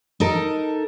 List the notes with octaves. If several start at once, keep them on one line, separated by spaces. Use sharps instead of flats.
D#4 A4 A#4